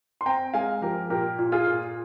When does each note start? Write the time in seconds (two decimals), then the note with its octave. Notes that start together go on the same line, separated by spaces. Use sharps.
0.21 C6
0.26 C4 G5 A#5
0.54 G#3 F5 G#5
0.81 F3 G4 A#4
1.10 A#2 G4 A#4
1.39 A#2
1.52 F4 G#4
1.67 A#2